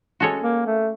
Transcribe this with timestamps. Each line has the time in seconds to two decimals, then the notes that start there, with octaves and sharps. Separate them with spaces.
0.20 G#3 C#4 F#4 A4 C#5
0.43 A#3
0.66 A3